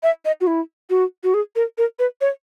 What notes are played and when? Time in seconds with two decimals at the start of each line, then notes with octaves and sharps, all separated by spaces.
0.03 E5
0.25 D#5
0.41 F#4
0.47 E4
0.90 F#4
1.23 F#4
1.34 G#4
1.56 A#4
1.78 A#4
1.99 B4
2.21 C#5